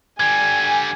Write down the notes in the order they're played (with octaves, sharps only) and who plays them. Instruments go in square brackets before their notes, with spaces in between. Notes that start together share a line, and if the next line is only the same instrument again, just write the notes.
[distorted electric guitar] D3 G3 [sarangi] G#5 [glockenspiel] G#6